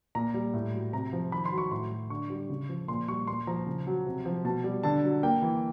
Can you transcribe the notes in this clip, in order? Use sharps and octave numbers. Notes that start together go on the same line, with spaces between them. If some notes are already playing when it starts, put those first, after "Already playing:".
A#2 A#5
G3
A2
F#3
C3 A#5
F3
D#3 B5
C6
F#3
C#6
A2 C6
F#3
D3 C#6
G3
C#3
F3
A#2 C6
G3 C#6
A#2 C6
F3 A#5
C#3
F#3
C3
F3
B2 A5
G3
D3 A5
F#3
A#3 G5
E3